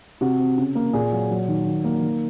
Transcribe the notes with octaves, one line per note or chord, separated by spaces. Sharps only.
C3 F#4
C4
C#3
A#3
A#2 G#4
F#3
F#3
D#3
D#3
A#3
D#3